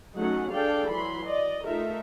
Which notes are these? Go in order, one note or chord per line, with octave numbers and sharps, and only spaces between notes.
F#3 A3 C#4 D#4 F#5
D4 G#4 A4 D5 F5 G5
E3 F#3 B5 C6
D5 D#5
A3 D#4 F4 A4 A#4 E5